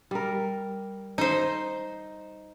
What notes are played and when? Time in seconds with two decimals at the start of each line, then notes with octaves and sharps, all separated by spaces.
0.11 G3 A#4
1.18 D#4 C5